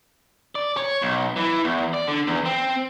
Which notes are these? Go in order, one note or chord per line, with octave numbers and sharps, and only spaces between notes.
D5
C#5
B1
E3
E2
D5
D3
E2
C4